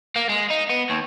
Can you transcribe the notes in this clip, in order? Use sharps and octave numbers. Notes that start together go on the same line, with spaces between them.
A#3
G#3
D#4
B3
D#2